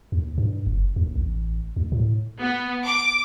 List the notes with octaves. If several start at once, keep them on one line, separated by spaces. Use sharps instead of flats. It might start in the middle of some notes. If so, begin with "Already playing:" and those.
D#2
G2
F#1
D#2
A1
D2
A2
B3
D6